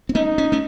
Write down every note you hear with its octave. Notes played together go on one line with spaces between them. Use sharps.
C4
A3 C#4 D#4
C#4
A3 C#4